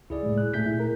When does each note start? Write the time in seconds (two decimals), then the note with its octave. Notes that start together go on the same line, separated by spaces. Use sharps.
0.10 C#2 E4 G#4 D5
0.22 A2 G#3
0.38 F#6
0.54 A#2 A3 G#4 G6 B6
0.66 E4
0.80 A#4